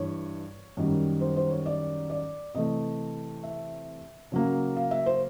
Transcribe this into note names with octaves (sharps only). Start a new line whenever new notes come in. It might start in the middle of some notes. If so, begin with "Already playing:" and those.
Already playing: G2 E3 C#5
F#2 D#3 G3
C5
C5
C#5
D5
D5
C3 E3 A3 D#5
E5
C#3 F#3 A#3
F5
E5
C5